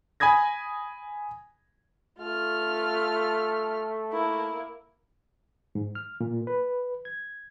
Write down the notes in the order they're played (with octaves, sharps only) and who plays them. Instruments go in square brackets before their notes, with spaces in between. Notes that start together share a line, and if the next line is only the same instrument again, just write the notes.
[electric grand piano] G#5 B5 D#6 G#6 A#6
[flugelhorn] A3 [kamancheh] F4 F6
[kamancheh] A#3 E4
[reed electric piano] G#2
F6
A#2
B4
G#6